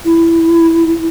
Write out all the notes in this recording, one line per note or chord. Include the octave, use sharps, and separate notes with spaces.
E4